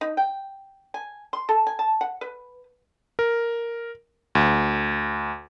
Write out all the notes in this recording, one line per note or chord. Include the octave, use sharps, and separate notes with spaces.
D#4
G5
G#5
C6
A4
G#5
A5
F#5
B4
A#4
D2